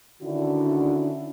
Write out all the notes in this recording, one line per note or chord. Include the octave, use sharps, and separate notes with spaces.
D3 D#3 C#4 D4 E4 F#4